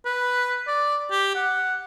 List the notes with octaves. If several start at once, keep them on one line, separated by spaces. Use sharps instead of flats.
B4
D5
G4
F#5